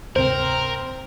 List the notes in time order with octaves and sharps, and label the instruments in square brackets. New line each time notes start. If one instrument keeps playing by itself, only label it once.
[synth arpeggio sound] D2 G2 C3 [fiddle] C4 [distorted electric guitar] A#4 [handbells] C5